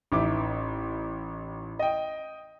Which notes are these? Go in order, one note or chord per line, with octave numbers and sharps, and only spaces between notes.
A1 D#4 E5 D6
D#5 G5